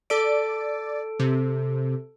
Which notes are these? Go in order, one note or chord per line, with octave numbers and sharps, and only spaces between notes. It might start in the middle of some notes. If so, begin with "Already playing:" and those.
A4 D5 D7
C3